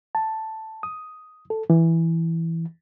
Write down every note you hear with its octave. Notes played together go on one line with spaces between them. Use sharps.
A5
D#6
A4
E3